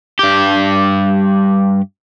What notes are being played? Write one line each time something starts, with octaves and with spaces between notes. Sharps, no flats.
G2 G4